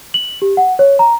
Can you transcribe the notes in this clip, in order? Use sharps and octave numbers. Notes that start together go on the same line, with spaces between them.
F#7
G4
F#5
C#5
A#5